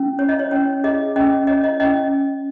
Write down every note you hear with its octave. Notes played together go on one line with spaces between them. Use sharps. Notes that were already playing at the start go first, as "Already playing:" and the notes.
Already playing: C#4
C#5
D#5
C#5
C#4 C#5
G#4 D#5
C#4 D#5
C#5 D#5
D#5
C#4 D#5